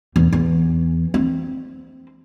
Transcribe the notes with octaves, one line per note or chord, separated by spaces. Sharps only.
E2
E2
C4